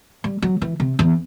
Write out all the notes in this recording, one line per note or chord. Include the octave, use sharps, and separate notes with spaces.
G3
F#3
E3
C3
E2